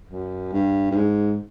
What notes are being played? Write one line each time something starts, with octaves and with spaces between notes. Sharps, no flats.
F#2
G2
G2
G#2